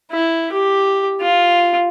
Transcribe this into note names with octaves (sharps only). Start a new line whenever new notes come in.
E4
G4
F4